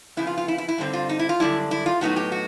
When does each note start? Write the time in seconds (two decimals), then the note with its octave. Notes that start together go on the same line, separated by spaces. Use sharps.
0.17 F2 C#3 B3 E4
0.27 F4
0.38 F4
0.48 E4
0.58 E4
0.68 E4
0.78 G2 D3 G3 C4 D#4
0.93 F4
1.09 D#4
1.19 E4
1.29 F4
1.40 F#2 D3 G3 D4 E4
1.71 E4
1.86 F4
2.01 A2 F#3 B3 D#4 F#4
2.16 G4
2.32 F#4